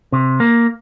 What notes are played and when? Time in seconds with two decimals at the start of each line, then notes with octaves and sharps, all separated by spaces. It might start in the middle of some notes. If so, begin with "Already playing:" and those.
0.12 C3
0.40 A#3